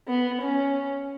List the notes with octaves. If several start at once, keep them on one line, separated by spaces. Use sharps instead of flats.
B3
C#4